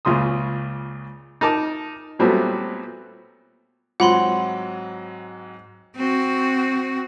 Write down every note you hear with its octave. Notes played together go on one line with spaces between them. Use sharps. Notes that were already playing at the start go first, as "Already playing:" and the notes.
C#2 A#2 C#3 C6 D#6
D#4 A#4 A5 D6
A#2 F#3 G3 A3 B3 C4
G#2 F#3 C4 F4 F#5 B5 C6
C4 F#4